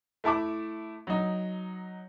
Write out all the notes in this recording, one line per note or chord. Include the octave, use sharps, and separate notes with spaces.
A3 E4 A5 D6
F#3 D#4